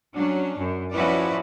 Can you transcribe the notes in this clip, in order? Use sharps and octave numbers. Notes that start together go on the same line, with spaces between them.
F#3 C#4 D4
F#2
F3 C#4 E4 F#4 B4 D5